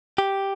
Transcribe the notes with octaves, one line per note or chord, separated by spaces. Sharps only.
G4